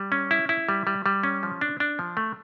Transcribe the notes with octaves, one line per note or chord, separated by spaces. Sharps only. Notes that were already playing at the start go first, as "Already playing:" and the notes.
Already playing: G3
C#4
E4
E4
G3
G3
G3
C#4
F3
D4
D4
F3
A3